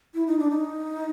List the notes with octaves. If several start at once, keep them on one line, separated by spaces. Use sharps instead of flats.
E4
D#4
D4
D#4